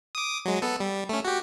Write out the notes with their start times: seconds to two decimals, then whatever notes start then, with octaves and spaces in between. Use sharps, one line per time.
0.15 D6 D#6
0.45 F#3 G#3
0.62 B3 A4
0.80 G3
1.09 A3 C#4
1.25 F#4 G4